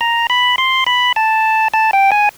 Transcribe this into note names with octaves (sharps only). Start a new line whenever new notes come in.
A#5
B5
C6
B5
A5
A5
G5
G#5